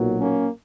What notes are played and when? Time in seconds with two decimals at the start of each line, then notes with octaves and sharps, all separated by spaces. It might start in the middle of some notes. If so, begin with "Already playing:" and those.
Already playing: B1 A#2 F#3
0.18 A#3 C#4